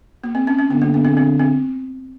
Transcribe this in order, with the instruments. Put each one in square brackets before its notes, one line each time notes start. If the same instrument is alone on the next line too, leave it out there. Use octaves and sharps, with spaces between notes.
[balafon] A#3
C4
C#4
C#4
[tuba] D3 [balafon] B3
[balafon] A#3
B3
C4
C4
C4